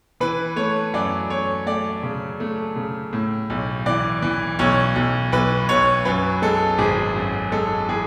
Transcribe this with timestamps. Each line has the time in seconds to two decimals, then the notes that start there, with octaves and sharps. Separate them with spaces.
0.20 E3 B4
0.56 A3 C#5
0.94 F#2 D5
1.30 A3 C#5
1.66 A3 D5
2.03 C#3
2.40 A3
2.76 C#3
3.13 A2
3.50 B1
3.86 E3 D5
4.22 E3
4.59 B1 C#5
4.96 B1
5.32 B1 B4
5.69 B1 C#5
6.05 F#2 B4
6.42 G#3 A4
6.78 G#1 G#4
7.16 F#2
7.52 G#3 A4
7.89 E3 G#4